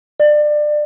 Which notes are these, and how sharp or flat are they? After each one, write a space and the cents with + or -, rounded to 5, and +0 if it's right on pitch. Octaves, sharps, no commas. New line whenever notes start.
D5 +25